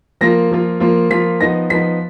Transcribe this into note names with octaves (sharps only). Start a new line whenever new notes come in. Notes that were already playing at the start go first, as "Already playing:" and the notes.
F3 A#3 F4 A#6
F3 A#3 F4
F3 A#3 F4
F3 A#3 F4 B6
F3 B3 D#4 A#6
F3 B3 D#4 B6